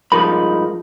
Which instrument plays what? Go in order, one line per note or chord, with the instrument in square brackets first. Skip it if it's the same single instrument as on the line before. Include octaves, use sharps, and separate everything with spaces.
[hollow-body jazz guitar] G2 F3 G#3 [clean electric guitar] D#4 A#4 B5